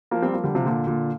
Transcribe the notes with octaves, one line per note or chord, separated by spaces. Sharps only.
F3 A#3
G3 C4
F3 A#3
D3 G3
C3 F3
A#2 D3
A#2 D3